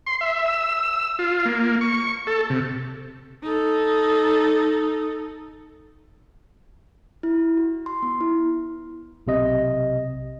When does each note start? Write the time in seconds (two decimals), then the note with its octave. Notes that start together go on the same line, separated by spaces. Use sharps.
0.06 C6
0.21 E5
0.46 E6
1.19 F4
1.45 A#3
1.81 C#6
2.27 A4
2.50 C3
3.43 D#4 A4
7.23 E4
7.57 F#4
7.86 C6
8.02 B3
8.21 E4
9.27 B1 C3 D#5